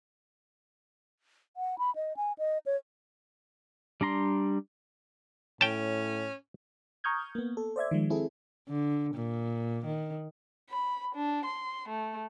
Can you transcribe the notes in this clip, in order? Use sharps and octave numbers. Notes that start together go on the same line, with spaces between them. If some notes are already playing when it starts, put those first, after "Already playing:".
F#5
B5
D#5
G#5
D#5
C#5
G3 D4 A#5 C6
A2 C#4 G5 A5
A#5 C#6 D#6 F6 G6 G#6
A#3 B3
A4
C5 D5 E5 G#6
D#3 F3 G#3
C4 E4 G#4 A4
D3
A#2
D#3
B5
D4
C6
A3